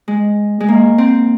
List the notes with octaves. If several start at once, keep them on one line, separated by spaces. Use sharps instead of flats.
G#3
G#3
A#3
C4